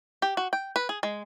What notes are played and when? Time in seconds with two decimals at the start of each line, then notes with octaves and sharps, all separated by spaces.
0.22 G4
0.37 F#4
0.53 G5
0.76 B4
0.89 G#4
1.03 G#3